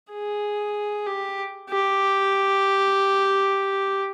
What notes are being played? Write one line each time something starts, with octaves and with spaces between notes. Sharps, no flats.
G#4
G4
G4